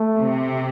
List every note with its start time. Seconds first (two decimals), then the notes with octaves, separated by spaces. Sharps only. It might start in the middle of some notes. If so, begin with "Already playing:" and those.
Already playing: A3
0.18 C3